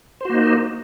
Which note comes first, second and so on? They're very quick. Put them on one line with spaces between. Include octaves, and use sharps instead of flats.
C5 F#4 A#3 D#4